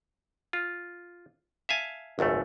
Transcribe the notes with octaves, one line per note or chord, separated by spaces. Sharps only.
F4
E5 F5 G#5 A5
G#1 C#2 F#2 A3